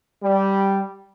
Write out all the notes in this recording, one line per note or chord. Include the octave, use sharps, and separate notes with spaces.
G3